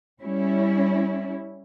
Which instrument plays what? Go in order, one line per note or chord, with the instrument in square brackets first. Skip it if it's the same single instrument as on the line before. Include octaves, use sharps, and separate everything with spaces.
[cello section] G3 C#4 E4